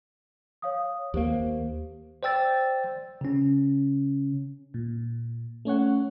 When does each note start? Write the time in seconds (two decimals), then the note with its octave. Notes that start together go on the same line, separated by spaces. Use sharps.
0.62 C#5 F5 D#6
1.14 D#2 A#3 G4 C5 F5
2.23 C5 D5 G5 E6 A6
3.21 C#3 C#4
4.74 A#2
5.65 A3 C#4 C#5 F#5